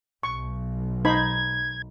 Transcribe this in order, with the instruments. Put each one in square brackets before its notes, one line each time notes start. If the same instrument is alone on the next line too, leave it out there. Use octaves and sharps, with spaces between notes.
[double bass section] B1 [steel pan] C#6
[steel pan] D#4 C5 B5 [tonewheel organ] G#6